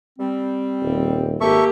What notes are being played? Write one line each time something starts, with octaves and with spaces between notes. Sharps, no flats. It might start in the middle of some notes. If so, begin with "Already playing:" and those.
G3 C4
D#1
G#1 A#3 G4 A4 E5 C#6